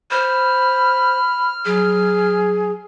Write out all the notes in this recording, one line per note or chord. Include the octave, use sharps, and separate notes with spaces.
C5 B5 F6
F#3 G#4